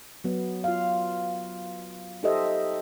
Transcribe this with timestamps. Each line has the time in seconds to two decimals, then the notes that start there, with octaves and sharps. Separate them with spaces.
0.24 F#3 B3
0.64 F4 F5
2.23 D#4 G4 A4 C5 D#5 E5